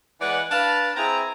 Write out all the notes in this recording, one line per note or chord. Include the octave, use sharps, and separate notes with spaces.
E3 G#3 B4 D5 F#5
D4 B4 F5 A5
C4 E4 G#4 G5 A#5